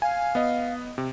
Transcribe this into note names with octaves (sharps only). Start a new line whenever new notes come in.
F5 G#5
B3 D#5
C3